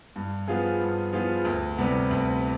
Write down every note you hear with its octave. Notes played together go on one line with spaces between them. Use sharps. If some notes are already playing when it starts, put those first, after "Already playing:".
G2
F3 B3 F4 G#4
G2
F3 B3 F4 G#4
D2
C3 G3 B3
D2